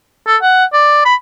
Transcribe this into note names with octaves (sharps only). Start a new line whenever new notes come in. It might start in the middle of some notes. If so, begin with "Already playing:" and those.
A4
F#5
D5
B5